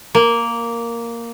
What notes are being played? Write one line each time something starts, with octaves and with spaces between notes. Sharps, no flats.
A#3